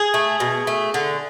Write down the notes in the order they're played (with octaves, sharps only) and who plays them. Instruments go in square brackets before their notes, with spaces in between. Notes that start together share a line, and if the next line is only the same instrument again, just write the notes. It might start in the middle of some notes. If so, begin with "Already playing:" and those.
Already playing: [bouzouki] G#4
A3
B2
A3
D3